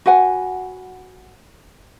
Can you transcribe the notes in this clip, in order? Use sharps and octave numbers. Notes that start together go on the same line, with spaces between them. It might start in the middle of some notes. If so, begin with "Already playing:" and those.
F#4 B4 F#5 G#5